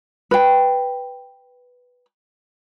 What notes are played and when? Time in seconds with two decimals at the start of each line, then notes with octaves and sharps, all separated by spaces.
0.31 B4 G5